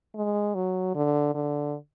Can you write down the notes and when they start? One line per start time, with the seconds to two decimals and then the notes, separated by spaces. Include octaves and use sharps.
0.15 G#3
0.55 F#3
0.95 D3
1.34 D3